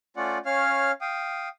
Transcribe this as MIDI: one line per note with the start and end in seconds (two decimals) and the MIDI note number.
0.17 0.38 57
0.17 0.38 61
0.17 0.38 65
0.17 0.38 74
0.17 0.38 78
0.46 0.91 61
0.46 0.91 73
0.46 0.91 77
0.46 0.91 89
1.01 1.49 77
1.01 1.49 79
1.01 1.49 87